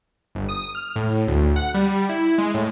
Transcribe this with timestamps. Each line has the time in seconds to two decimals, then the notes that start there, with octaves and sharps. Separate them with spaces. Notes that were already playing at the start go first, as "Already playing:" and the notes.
0.35 G1
0.49 D#6
0.75 F6
0.96 A2
1.27 D2
1.56 F#5
1.74 G3
2.09 E4
2.38 G#3
2.54 A2